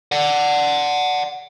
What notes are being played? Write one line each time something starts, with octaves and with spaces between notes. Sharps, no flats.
D5 F#5